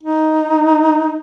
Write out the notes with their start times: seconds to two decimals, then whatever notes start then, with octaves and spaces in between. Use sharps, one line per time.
0.03 D#4